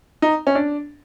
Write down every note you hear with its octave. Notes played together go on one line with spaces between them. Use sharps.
D#4
C#4
D4